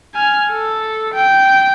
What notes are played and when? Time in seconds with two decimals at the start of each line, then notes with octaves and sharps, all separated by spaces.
0.14 G#5 F6
0.51 A4
1.14 G5